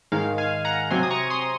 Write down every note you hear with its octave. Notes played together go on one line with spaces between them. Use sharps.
G#2 D#3 G#3 F5
F5 G#5
F#5 A#5
C3 F#3 C4 G#5 C6
D#6
A#5 C#6
C6 D#6